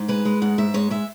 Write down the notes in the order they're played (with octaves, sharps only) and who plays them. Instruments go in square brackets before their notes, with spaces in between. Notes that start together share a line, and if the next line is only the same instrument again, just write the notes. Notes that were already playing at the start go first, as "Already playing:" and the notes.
Already playing: [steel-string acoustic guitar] G#2
G#3 B4
G#3
G#2 F#5
G#2 E5
G#3 C#5
G#3 E5